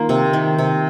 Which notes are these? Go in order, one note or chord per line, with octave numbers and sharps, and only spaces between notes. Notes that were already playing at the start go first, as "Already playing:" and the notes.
Already playing: D#3 A#3 F4
C3
D#3
C3